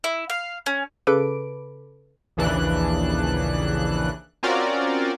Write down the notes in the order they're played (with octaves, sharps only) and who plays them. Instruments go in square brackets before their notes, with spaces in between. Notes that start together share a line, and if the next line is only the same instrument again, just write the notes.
[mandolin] E4
F5
C#4
[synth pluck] C#3 A4 B4 B5 D6 D7
[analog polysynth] A#1 D#2 C#3 E3 D4 F#6
C4 C#4 F4 F#4 A#4 D5